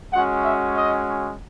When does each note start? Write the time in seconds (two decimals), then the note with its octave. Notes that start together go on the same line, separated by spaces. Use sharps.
0.13 G#3 C#4 F#4 F#5
0.43 E5
0.74 D#5